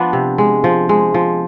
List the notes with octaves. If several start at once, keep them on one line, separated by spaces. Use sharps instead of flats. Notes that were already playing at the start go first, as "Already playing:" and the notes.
Already playing: F3 B3 D4
C3
G#3
F3
G#3
F3